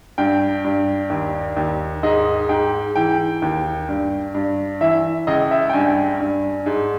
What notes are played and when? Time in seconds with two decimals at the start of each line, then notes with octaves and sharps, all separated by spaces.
0.18 G2 G5
0.64 G2
1.10 D#2
1.57 D#2
2.03 G#2 D#5
2.49 G#2 G5
2.96 E3 G5
3.42 D#2
3.89 G2
4.35 G2
4.81 E3 E5
5.27 C#2 D#5
5.51 E5
5.70 G5
5.73 G2 G#5
6.20 G2
6.66 G#2